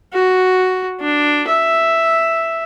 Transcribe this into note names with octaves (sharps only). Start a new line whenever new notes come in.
F#4
D4
E5